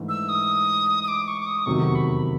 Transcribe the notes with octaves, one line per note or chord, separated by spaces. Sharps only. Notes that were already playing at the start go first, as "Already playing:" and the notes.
Already playing: G#2 E3 A3 D4
E6
D#6
D#6
D6
C#6
D6
D#6
F1 E2 C3 D#3 F#3 C#6
B5